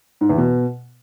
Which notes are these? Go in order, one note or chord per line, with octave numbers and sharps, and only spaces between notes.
G#2
E2
B2